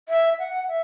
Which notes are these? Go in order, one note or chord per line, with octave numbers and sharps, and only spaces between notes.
E5
F#5
E5